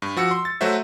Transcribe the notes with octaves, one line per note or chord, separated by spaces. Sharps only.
G2
F3 F#4 E6 C#7
C6
A6
F#3 A3 F#4 C5 E5